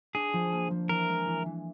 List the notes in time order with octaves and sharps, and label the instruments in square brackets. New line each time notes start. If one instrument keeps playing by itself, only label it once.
[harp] D4 [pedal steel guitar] G#4
[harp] F3
A#3
F3
[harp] E3 [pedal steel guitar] A#4
[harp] G#3
E3
E3